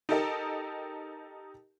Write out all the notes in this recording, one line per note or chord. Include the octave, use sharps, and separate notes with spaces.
D#4 G4 A4 A#4 D#5